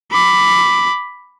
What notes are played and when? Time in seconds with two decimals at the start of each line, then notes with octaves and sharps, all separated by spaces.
0.12 B5 D6